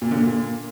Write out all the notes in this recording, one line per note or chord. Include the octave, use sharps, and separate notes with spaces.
A#2
D3
A#2